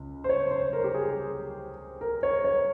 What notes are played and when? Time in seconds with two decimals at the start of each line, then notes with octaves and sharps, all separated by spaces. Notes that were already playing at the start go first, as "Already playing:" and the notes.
Already playing: C#2
0.24 C5
0.29 C#5
0.51 C5
0.73 A#4
0.84 G4
0.94 G#4
2.01 A#4
2.23 C#5
2.44 C#5